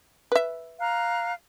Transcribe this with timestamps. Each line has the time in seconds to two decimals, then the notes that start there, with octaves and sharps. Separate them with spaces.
0.32 B4 E5
0.80 F5 A#5 F#6